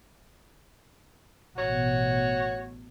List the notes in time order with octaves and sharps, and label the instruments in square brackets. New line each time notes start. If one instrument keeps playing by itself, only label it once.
[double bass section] A1 B2 [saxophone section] F#4 C#5